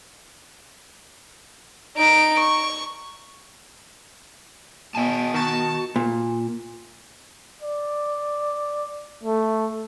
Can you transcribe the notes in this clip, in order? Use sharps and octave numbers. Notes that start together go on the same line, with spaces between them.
D#4 D7
C#6
B2 D#5 G#5 A5
D#3 F#4 A5
A#2
D5
A3